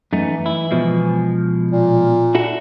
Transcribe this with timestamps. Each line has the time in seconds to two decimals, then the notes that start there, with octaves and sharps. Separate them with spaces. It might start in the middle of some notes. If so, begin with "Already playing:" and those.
0.13 F#2 E3 A3 D#4
0.46 E4
0.71 B2 F3 G#3
1.71 A#2
2.35 E4 F#4 A4